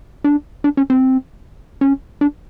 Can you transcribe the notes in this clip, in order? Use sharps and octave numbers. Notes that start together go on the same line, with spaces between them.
D4
D4
C#4
C4
C#4
D4